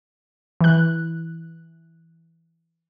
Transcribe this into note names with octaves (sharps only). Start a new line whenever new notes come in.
E3 F#6